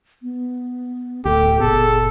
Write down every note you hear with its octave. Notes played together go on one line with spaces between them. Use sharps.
B3
D1 D2 G4 A4
F#1 A#2 B3 G#4 A4